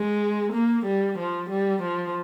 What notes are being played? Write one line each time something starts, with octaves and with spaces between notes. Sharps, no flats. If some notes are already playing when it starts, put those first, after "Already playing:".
Already playing: G#3
A#3
G3
F3
G3
F3